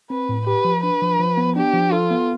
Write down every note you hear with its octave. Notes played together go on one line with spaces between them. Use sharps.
C4 B4
A2
G4 B4
F3
D4 B4
F3
F3
B3
D4 G4
F3
F4 A4
B3